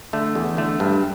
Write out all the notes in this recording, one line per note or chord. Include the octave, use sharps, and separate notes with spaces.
D3 A3
E2
D3 A3
G2